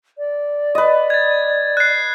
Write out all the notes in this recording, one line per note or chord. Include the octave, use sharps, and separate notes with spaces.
D5
B4 D#5
G#6 A6
F#6 C7